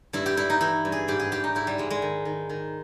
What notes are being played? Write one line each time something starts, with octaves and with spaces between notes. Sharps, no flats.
G2 E4
G4
G2 E4
D#4
E3 E4
G2
G#4
G#2 G4
G#4
G#2 G4
D#4
G#2 E4
G3
G#2 G#3
G#3
D#3
D#3
D#3